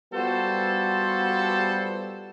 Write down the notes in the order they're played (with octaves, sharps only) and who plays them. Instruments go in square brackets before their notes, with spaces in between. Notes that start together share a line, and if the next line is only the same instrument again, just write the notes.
[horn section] G3 B3 F4 F#4 A4 C5